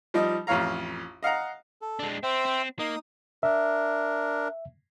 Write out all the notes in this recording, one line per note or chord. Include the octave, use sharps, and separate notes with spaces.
F3 G3 D#4 D#5
A1 F2 F4 C#5 F5 A#5
D#5 F5 F#5 A#5
A4
G#3 D4
C4 C5 E5 G5
C4
A#3 D#4 D#6
D4 A#4 E5